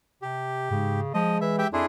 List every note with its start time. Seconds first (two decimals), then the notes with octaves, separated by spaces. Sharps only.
0.22 C3 G4
0.70 G#2 C#3
1.14 F3 G#3 D#5
1.41 E3 E5
1.58 G4 E5 G5
1.73 F2 D4 E4 G#4 C6